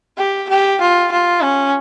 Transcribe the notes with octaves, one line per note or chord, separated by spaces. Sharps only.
G4
G4
F4
F4
C#4